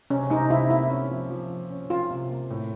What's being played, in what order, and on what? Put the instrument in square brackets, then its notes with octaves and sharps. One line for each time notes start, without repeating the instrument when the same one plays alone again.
[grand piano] C3 [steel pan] C#4
[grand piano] C3 [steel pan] D#4
[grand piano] C3 [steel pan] E4
[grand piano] A#3 [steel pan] E4
[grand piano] C#4
F3
F3
F3
C#4
[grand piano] C#4 [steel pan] F4
[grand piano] C3
A#3
A2